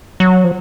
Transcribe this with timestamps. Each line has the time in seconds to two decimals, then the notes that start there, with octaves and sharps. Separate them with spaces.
0.20 F#3
0.44 F3